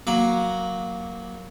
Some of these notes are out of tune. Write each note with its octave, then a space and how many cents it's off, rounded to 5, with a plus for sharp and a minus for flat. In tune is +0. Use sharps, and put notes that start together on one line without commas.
F#3 +0 A#3 +0 D6 +0